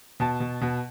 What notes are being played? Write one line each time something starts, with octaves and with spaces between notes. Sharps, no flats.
B2 A5
B2
B2